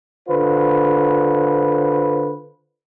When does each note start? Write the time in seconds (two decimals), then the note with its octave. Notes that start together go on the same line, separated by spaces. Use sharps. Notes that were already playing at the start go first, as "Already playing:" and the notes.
0.29 D3 F4 B4 C5